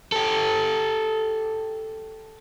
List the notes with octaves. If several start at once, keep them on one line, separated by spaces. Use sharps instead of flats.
G4 A4